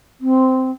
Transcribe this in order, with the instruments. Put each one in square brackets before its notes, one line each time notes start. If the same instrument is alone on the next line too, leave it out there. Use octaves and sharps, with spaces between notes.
[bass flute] C4